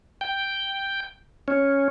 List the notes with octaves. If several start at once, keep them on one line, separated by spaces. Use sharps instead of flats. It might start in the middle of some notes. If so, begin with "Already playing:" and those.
G5
C#4